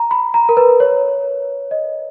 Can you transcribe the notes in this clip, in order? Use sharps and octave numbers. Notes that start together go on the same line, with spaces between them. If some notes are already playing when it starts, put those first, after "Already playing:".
Already playing: A#5
B5
A#5
A#4
B4
C#5
D#5